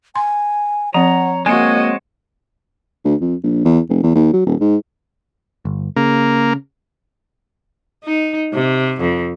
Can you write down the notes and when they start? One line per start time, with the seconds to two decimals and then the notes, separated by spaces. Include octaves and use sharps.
0.16 G#5 C6
0.94 F3 C4 C#5 F#5 A#5
1.46 G#3 A#3 C4 F#4 C#5 D#5 G#5
3.05 D2
3.21 F2
3.43 A#1
3.65 E2
3.89 F1
4.03 E2
4.15 D#2
4.33 F#3
4.46 D#1
4.61 G#2
5.65 G1
5.96 C#3 A#3
8.04 D#4
8.53 C3
9.01 F2